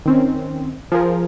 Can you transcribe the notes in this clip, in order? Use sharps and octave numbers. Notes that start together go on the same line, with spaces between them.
D#3 C4 C#4
F3 G#4 A#4